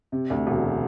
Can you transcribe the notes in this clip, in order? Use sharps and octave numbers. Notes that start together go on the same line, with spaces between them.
C3
D2
E1